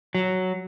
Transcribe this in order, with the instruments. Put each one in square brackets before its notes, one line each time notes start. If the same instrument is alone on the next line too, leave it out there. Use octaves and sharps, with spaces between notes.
[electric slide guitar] F#3